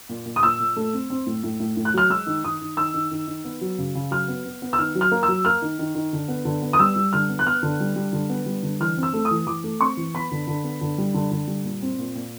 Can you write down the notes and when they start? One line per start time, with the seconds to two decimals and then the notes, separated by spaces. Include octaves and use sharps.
0.09 A#2
0.26 A#2
0.36 D#6
0.43 A#2 E6
0.60 A#2
0.77 A3
0.93 C4
1.10 C4
1.26 A2
1.44 A2
1.60 A2
1.77 A2
1.85 F#6
1.94 F#3 F6
2.10 G#3 E6
2.27 D#3
2.44 D#3 D#6
2.61 D#3
2.77 D#3 E6
2.94 D#3
3.11 D#3
3.28 D#3
3.45 B3
3.61 F#3
3.78 C#3
3.95 C#3
4.11 F#3 F6
4.28 B3
4.45 B3
4.62 B3
4.73 E6
4.78 D#3 F6
4.95 F#3
5.01 F6
5.12 A#3
5.23 E6
5.28 F#3
5.45 A#3 F6
5.62 D#3
5.79 D#3
5.95 D#3
6.13 D3
6.28 B3
6.45 D3
6.62 B3
6.73 D#6
6.79 G3 E6
6.96 G3
7.13 D3 F6
7.29 B3
7.39 F#6
7.46 B3 F6
7.63 D3
7.80 G3
7.96 G3
8.13 D3
8.29 B3
8.46 G3
8.63 D3
8.80 E3 F6
8.97 C4
9.03 E6
9.13 A3
9.25 D#6
9.31 E3
9.47 E3 D6
9.64 A3
9.80 C4 C#6
9.97 E3
10.15 B3 B5
10.31 D3
10.47 D3
10.64 B3
10.81 D3
10.98 G3
11.14 D3
11.31 D3
11.48 G3
11.64 A#2
11.82 C4
11.99 A#2
12.15 A#2